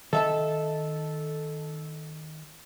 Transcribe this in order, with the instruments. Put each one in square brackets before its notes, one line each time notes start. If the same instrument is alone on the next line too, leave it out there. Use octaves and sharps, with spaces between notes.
[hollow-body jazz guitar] D#3 E5 A5 [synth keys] A4